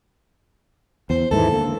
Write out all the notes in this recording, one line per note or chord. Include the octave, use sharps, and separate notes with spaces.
E2 C5
D#2 G#2 E3 A4
D3 A#3